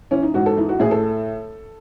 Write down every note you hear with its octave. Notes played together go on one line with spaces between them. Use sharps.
E3 C#4
D#4
G#2 F#4
A4
E3 D#4
F#4
A2 G#4
A4